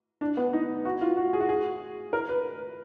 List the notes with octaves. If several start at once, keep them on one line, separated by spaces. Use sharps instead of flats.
D4
B3
D#4
F#4
F4
F#4
G#4
F#4
G#4
A#4
B4